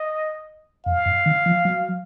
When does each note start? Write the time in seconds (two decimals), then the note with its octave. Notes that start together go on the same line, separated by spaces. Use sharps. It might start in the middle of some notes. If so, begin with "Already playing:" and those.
Already playing: D#5
0.86 F2 F5
1.06 F#2
1.26 D#3
1.46 F3
1.65 F#3